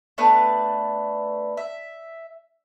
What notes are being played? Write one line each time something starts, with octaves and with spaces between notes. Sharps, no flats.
A3 B3 D4 B4
E5